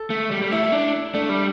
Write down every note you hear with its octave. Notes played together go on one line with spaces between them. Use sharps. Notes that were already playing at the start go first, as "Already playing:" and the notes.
Already playing: A4
A3
G3
G3
A3 E4
D4
A3 D4
G3